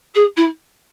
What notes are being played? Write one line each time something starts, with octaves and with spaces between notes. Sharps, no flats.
G#4
E4